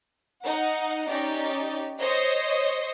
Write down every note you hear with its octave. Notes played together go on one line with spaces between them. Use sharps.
D#4 F#5
C#4 D#4 G4 D5
C5 C#5 D#5